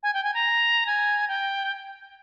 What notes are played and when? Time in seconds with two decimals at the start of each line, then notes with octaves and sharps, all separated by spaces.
0.03 G#5
0.14 G5
0.24 G#5
0.34 A#5
0.87 G#5
1.28 G5